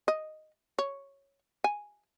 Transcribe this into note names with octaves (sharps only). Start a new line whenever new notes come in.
D#5
C#5
G#5